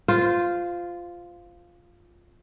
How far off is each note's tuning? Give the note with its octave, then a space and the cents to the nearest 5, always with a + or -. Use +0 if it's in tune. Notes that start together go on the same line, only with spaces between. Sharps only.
F4 +0 C5 -20